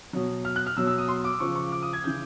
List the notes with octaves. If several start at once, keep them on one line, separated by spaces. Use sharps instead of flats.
B2 F#3
F6
F#6
F6
B2 F#3 E6
E6
D#6
C6
D6
C#3 F3 C#6
C#6
D6
D#6
G#6
C#3 E3 G6